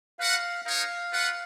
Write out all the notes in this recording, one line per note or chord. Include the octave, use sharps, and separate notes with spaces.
F#4 B4 F5 F#5
D#4 A#4 C#5 F5
F4 B4 F#5